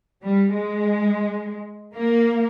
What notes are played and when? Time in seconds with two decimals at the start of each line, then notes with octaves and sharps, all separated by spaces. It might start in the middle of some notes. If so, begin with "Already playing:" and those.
0.24 G3
0.54 G#3
1.95 A#3